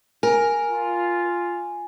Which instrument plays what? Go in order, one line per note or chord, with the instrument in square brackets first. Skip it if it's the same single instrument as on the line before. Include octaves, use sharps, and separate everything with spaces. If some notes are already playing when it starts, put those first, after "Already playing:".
[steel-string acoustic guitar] A#4 [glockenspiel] G#5
[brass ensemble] F4